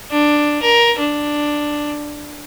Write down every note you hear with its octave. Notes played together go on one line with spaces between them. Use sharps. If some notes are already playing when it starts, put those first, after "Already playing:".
D4
A#4
D4